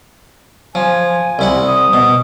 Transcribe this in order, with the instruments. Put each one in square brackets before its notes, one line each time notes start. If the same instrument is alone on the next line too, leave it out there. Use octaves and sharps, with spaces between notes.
[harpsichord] F3 [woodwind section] G#5
[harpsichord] C2 E4 F#5
[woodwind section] D#6
[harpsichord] B2